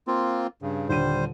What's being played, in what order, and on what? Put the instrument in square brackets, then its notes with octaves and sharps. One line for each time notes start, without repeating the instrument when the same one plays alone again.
[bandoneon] A#3 C4 F4
G2 C#3
[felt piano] D#1 D3 D#7 [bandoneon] G3 C5